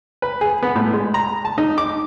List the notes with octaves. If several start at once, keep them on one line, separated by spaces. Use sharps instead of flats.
B4
G#4
B3
A2
G#3
A#5
A5
D#4
D6